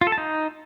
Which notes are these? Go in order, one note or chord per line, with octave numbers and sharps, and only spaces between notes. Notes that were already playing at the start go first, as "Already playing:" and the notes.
F4
A4
A5
D#4